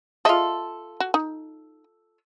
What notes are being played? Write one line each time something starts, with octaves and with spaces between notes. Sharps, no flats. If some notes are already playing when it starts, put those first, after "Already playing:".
F4 G#4 A4 D#5 E5
F#4
D#4